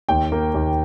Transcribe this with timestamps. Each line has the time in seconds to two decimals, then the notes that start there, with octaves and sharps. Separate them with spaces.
0.09 D#2 G5
0.32 A#3
0.54 D#2